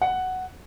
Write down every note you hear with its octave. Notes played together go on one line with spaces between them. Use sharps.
F#5